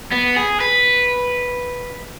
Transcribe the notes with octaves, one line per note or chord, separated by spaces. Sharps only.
B3
G#4
B4